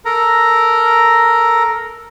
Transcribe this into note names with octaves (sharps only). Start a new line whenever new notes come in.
A4 A#4 A#5